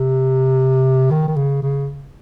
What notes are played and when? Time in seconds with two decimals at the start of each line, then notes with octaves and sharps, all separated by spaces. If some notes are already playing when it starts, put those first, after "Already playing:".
Already playing: C3
1.11 D#3
1.28 D#3
1.36 C#3
1.62 C#3